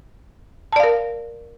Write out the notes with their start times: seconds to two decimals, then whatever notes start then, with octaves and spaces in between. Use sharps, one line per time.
0.72 A5
0.76 D5
0.80 F5
0.83 A#4